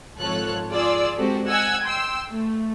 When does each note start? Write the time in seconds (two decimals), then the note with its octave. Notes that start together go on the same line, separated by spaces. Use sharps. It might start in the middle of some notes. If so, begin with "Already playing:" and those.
0.19 G#1 F3 F4 A4 C#5 F#6
0.71 F4 G#4 D5 E6
1.16 G#3 C4 F#4 G4 A4
1.48 D#5 F#5 G#5 E6 G#6
1.84 G5 C6 E6
2.28 A3